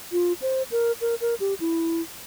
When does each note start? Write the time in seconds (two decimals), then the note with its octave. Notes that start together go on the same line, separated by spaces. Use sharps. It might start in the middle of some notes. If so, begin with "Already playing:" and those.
0.12 F4
0.42 C5
0.71 A#4
1.01 A#4
1.21 A#4
1.40 G4
1.60 E4